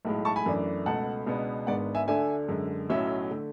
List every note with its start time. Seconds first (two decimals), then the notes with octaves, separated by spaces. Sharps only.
0.05 B1 A2 G#3
0.25 A5 C#6
0.36 G#5 B5
0.46 F#2 E3 A3 D4
0.86 C#2 B2 A3 F#5 A5
1.26 C#2 B2 G#3 B3 D4
1.67 G#1 G#2 G#3 B3 D4 D5 F#5
1.95 E5 G#5
2.08 D2 D3 A3 D4 E5 G#5
2.49 F#2 D3 G#3
2.90 B1 A2 F#3 C#4 E5
3.31 D3 A3